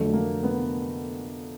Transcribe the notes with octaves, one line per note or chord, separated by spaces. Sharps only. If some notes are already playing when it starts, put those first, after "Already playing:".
Already playing: F2 D3 F#3 A3
A#3
B3